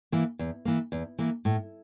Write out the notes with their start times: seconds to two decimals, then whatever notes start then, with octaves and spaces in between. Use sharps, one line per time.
0.12 E3 A#3
0.39 E2
0.65 E3 A#3
0.92 E2
1.18 E3 A#3
1.45 A2